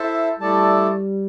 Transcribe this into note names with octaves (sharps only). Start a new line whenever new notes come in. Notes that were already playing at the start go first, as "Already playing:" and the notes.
Already playing: E4 A4 C5 E5 A5
G3 A3 E4 A4 D5 A5